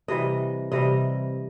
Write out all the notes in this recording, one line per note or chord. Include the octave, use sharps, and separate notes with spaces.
C3 E3 G3 D#5
C3 E3 G3 D#5